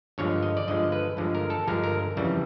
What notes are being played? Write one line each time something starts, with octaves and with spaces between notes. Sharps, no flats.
G2 D3 F3 G#3 C#5
D#5
D5
G2 D3 F3 G#3 D#5
B4
G2 D3 F3 G#3
A#4
A4
G2 D3 F3 G#3 A#4
A#4
F2 C#3 E3 G3